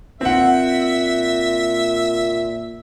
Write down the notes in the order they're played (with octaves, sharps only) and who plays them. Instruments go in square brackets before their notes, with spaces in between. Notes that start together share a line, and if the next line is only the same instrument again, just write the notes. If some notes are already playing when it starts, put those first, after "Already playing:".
[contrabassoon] A#2 [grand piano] C4 F#5 [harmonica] E5